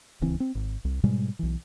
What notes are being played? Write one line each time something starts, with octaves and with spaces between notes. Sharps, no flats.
D1 C#2 E3 C4
C4
G#1
C2
G#2 B2 G3 G#3
B1 E3